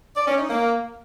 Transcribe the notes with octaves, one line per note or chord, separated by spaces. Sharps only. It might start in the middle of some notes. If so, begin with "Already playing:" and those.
D5
C#4
D#4
A#3